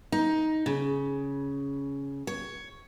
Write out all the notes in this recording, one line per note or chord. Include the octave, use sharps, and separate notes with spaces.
D#4
C#3
C#5